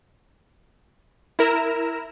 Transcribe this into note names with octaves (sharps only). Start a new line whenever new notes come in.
E4 A#4 A#5 E7